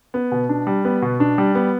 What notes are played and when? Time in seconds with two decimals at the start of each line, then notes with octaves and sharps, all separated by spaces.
0.14 B3
0.32 B2
0.49 D4
0.67 G3
0.85 B3
1.02 B2
1.20 D4
1.38 G3
1.55 B3